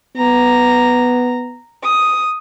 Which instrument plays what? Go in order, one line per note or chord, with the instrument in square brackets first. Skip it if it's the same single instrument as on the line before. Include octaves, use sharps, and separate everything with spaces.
[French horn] B3 [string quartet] A#5
[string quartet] D#6